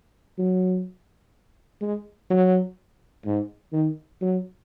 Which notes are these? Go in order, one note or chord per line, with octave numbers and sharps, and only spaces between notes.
F#3
G#3
F#3
G#2
D#3
F#3